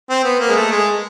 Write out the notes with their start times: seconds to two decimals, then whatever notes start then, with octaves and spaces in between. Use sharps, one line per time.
0.10 C4
0.24 B3
0.40 A#3
0.49 G#3
0.55 A3
0.71 G#3